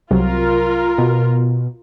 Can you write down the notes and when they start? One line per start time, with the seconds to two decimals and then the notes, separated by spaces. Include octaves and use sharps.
0.11 C2 C3 F#3 F4 A#4
0.98 B2